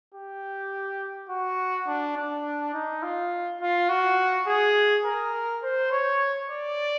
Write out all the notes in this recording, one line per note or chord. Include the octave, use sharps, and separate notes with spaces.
G4
F#4
D4
D4
D#4
F4
F4
F#4
G#4
A#4
C5
C#5
D5